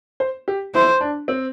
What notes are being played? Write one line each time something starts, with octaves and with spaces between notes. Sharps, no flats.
C5
G4
E4 C5
D4
C4